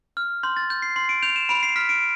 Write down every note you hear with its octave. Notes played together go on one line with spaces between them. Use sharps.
F6
C6 G6
A6
G6
C7
C6 C7
D7
G6 F7
E7
B5 D7
C7
F6 B6
D7